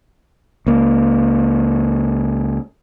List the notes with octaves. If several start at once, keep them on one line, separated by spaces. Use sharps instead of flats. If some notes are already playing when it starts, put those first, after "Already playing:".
C#2 A#3